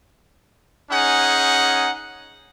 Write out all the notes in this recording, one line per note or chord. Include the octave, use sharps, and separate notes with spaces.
C#4 D#4 G#4 F#5